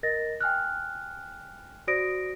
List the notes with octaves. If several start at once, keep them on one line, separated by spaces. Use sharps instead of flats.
A#4 D#5 A6 A#6
G5 G#5 F6 F#6
F#4 C5 D5 D#6 A#6 D7